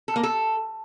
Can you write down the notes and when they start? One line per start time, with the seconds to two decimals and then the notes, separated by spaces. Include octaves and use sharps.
0.08 A4
0.16 A#3
0.23 A4